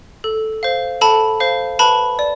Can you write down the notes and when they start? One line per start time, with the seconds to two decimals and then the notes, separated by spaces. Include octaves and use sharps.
0.24 A4
0.63 C5 F5
1.01 A4 A5 B5
1.40 C5 F5
1.79 B4 A5 B5
2.19 D5